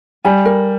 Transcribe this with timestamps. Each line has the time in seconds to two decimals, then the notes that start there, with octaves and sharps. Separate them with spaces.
0.25 G3 G#5
0.45 A#4